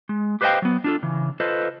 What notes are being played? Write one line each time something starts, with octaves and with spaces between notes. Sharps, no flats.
G#3
G4 B4 C5 D#5 F5 G5
F#3 B3
D4 F4 A4
C#3 E3
F4 A4 B4 C5 D#5